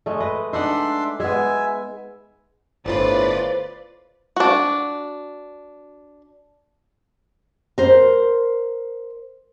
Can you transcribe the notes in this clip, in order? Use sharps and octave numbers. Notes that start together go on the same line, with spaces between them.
G#3 A3
B4 D#5
D4 D#4 E5 F#5 C6
G#3 B3 E5 G#5
G1 A2 F4 B4 C5 D5 A6
D4 F#4
A#4 C5